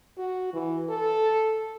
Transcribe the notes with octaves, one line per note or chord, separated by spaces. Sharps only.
F#4
E3
A4